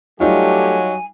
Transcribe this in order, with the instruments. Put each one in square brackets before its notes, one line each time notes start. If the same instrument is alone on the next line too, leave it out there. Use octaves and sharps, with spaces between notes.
[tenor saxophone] F#3 [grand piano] G3 D#4 F4 [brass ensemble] A3 G4 [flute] G#5